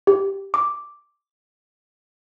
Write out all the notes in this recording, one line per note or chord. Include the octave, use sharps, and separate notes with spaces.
G4
D6